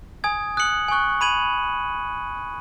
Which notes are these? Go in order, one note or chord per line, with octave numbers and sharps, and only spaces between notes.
G#5 D#6 G#6
D#6 F#6 C#7 F#7
G#5 C#6 F#6
B5 G#6 D#7 F#7